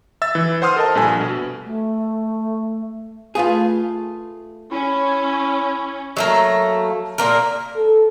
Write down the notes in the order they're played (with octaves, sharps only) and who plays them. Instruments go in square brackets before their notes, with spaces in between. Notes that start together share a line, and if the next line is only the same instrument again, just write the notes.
[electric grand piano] E5 E6 A6
E3
C5 F#5 C6 D#6 F6
A4 A#4 D#5 A5
A#1 G2 A4 G#5
B2
[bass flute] A3
[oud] A3 B4 F5 [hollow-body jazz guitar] F4 G#4
[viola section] C#4 [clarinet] E4
[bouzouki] F#3 A3 A#3
A#2 A#3 A#4
[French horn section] A4